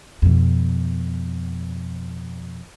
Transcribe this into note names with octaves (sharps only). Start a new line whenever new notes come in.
F2 B2